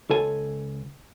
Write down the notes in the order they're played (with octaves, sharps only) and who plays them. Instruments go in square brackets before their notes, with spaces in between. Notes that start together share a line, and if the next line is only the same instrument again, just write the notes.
[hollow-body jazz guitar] C#2 A4 G#5